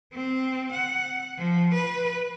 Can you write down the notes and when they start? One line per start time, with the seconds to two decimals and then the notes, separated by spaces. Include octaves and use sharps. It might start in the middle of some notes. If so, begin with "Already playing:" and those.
0.13 C4
0.72 F#5
1.38 F3
1.74 B4